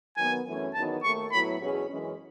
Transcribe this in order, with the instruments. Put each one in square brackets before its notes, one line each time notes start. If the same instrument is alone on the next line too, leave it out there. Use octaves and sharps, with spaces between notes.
[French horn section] D#3 F#3 B3 [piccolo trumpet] G#5
[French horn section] F#2 E3 A3 C#4
[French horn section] E2 D#3 F#3 B3 D#4 [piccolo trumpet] A5
[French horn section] D#2 D#3 A3 [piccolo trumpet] C#6
[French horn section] A2 F#3 B3 E4 [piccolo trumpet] B5
[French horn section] E2 B2 F#3 C#4 G#4
F#2 E3 G#3 C#4